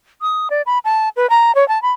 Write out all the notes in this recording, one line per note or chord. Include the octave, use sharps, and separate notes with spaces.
D#6
D5
B5
A5
B4
A#5
C#5
A5
B5